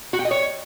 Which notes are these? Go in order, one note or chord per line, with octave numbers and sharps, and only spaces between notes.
F#4
G5
D#5
C#5